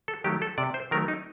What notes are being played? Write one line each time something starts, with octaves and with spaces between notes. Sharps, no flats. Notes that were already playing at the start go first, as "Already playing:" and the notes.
A4
D#3 F#3 A3 G4
A4
C3 D5
C5
D#3 F#3 A3 A#4
D#4